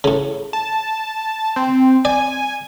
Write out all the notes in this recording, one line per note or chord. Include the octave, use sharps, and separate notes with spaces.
A2 C#3
A5
C4
D5 G#5